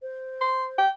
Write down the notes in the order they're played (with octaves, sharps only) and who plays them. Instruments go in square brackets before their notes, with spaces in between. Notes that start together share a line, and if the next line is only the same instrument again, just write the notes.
[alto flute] C5
[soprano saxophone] C6
G5